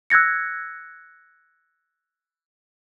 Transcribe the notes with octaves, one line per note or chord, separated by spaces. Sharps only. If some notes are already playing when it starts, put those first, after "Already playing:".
E6 F#6 G#6 A#6 C#7